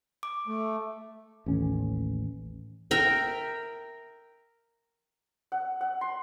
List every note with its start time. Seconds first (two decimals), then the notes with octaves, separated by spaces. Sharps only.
0.23 D6
0.47 A3
1.46 A1 D#2 C#4
2.91 A#4 E5 G5
5.52 F#5
5.81 F#5
6.01 C6